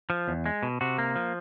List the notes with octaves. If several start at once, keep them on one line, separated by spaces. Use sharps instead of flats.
F3
E2
G#3
B2
C3 F#4
A#3
F3